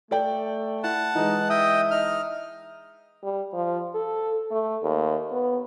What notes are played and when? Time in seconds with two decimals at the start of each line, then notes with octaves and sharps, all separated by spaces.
0.11 A3 A4 D5 G5
0.84 E4 F#5 A5
1.15 E3 G#3 D#4
1.50 D#5 E5 G5 D#6
1.91 D#4 F6
3.23 G3
3.53 F3
3.94 A4
4.51 A3
4.83 D#2
5.32 B3